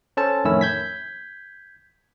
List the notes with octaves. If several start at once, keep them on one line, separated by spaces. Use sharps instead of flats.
C#4 A4 C5 A5
F2 A2 D#3 C#4 E4 E6
G6 G#6 B6